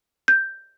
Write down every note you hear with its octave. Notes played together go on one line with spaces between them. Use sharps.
G6